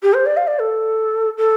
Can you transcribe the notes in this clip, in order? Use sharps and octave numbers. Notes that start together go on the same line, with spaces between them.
G4
C5
D5
F5
D5
A4
A4